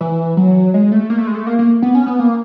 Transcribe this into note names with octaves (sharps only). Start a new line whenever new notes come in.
E3
F#3
G#3
A3
A#3
A3
G#3
A3
A#3
A#3
B3
C#4
B3
A#3